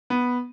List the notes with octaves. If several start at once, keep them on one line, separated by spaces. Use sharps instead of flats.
B3